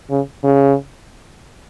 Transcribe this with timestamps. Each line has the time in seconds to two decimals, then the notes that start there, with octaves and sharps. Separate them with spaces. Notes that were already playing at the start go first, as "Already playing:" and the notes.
0.10 C#3
0.44 C#3